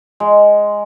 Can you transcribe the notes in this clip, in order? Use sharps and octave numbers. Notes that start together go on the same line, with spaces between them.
G#3